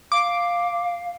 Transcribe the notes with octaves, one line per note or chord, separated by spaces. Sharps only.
F5 D6